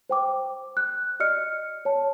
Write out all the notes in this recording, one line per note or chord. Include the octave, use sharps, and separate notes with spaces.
C5 G5 D6
F#6
D5 D#5 F6 C#7
C#5 A5